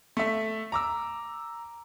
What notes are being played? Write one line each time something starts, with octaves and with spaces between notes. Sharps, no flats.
A3 E5
A#5 D6 E6